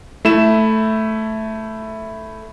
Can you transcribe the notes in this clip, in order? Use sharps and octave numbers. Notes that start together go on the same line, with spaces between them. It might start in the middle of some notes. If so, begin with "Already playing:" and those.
A3 E4 E7